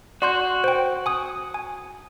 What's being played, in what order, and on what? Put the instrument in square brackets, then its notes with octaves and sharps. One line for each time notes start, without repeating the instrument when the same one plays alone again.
[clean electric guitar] F#4 [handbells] D5 C6 G6
[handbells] C5 G5
G#5 D#6
G#5